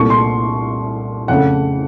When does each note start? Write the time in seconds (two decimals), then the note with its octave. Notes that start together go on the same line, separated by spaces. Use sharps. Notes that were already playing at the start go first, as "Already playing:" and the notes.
Already playing: C2 A#2 A3 C#6
0.10 C6
1.28 F2 C#3 A3 F#5